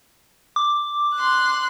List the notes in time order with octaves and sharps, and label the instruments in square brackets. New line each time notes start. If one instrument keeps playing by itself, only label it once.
[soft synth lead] D6
[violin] C6 F#6